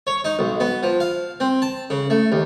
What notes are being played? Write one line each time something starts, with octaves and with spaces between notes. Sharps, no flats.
C#5
D#4
B1
B3
F3
F5
C4
A5
C#3
A3
D#2